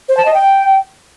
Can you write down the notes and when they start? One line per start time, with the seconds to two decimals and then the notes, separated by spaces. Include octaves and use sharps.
0.09 C5
0.17 A5
0.25 D#5
0.34 G5